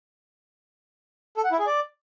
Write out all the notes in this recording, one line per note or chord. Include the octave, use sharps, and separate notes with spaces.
A4
F#5
E4
G#4
D5